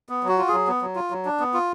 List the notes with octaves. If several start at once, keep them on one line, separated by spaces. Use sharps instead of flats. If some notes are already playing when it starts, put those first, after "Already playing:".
B3
F#3 F#4
F4
F#3 G#4
B3
F#3
F4
F#3
D4
B3
F4